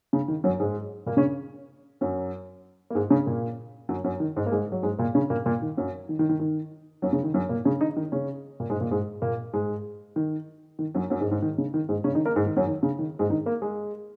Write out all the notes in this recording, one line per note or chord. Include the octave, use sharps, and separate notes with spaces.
C#3
D#3
F#2 F#3
G#2 G#3
A#2 A#3
C#3 C#4
F#2 F#3
A#3
G#2 G#3
C#3 C#4
A#2 A#3
F#2 F#3
F#2 F#3
D#3
G#2 G#3
A#3
G#2 G#3
F#3
G#2 G#3
A#2 A#3
C#3 C#4
A#2 A#3
A#2 A#3
D#3
F#2 F#3
D#3
D#3
D#3
D#3
F#2 F#3
C#3
D#3
F#2 F#3
A#2 A#3
C#3 C#4
D#3 D#4
D#3 D#4
C#3 C#4
A#2 A#3
G#2 G#3
A#2 A#3
G#2 G#3
A#2 A#3
G#2 G#3
D#3
D#3
F#2 F#3
F#2 F#3
G#2 G#3
G#2 G#3
D#3
C#3
D#3
G#2 G#3
C#3 C#4
D#3 D#4
A#3 A#4
G#2 G#3
D#3
F#2 F#3
D#3
C#3
D#3
G#2 G#3
D#3 D#4
A#3 A#4
G#3 G#4